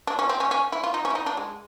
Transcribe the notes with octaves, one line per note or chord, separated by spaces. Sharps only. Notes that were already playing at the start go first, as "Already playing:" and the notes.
D4
C#4
C4
C#4
C#4
E4
F4
D#4
C#4
E4
D#4
D4
G#3